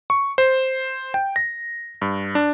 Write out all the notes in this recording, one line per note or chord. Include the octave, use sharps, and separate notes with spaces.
C#6
C5
G5
A#6
G2
D4